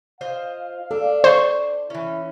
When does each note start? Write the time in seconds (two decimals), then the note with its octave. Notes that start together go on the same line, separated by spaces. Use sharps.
0.21 F4 C5 D#5 F5
0.91 D4 A4
1.24 C5 D5 C#6
1.90 E3 C#4 E4